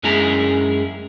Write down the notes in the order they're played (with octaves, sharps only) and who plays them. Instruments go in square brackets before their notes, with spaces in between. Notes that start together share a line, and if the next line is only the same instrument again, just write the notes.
[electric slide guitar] F#2 G#3 C#4 E4 G#4 A#5